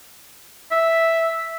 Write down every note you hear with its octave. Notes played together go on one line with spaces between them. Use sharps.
E5